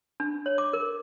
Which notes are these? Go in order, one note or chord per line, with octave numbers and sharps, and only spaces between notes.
D4
C#5
D6
A#4